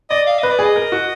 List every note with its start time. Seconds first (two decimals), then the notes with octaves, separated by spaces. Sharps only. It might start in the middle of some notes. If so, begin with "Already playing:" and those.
0.10 D5 D#5
0.27 F5
0.39 B4 D#5
0.51 D5
0.59 G#4 D#5
0.76 A#4
0.92 F#4